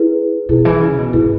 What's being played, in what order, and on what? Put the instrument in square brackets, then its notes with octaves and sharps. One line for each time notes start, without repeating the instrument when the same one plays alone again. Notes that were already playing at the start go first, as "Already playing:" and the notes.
Already playing: [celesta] E4 G#4 B4
[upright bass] B2 [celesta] E4 G#4 B4
[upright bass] E3
C#3
B2
[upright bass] G#2 [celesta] E4 G#4 B4